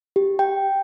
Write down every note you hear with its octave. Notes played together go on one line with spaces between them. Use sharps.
G4
G5